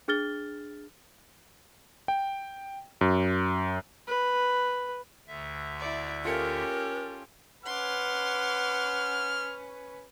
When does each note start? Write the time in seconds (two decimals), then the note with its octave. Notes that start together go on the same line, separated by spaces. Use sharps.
0.08 D4 G#4 F6 A6 G7
2.08 G5
3.01 F#2
4.07 B4
5.27 D2 D3 E5
5.79 E4 D5
6.25 C#4 F4 G4 A4 A#4 C#7
7.66 C#4 B4 F#5 C6 D6 F6